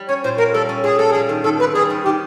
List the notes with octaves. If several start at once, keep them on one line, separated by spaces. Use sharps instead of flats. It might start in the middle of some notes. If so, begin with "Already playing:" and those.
Already playing: G3
C#4 C#5
A#2 C5
A#3 A#4
G3 A4
C#4
A#2 G#4
A#3 A4
G3 G#4
D#3
D#3 A4
C4 B4
G3 G#4
D#3
D#3 G4